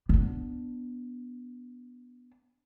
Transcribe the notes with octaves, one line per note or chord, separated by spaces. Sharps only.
B3 D4